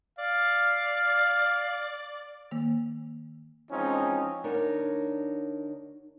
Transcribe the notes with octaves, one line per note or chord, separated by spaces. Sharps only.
D5 F5
D#3 A#3
E3 F3 G#3 C4 C#4 D#4
D2 D4 D#4 F#4 A#4 C#5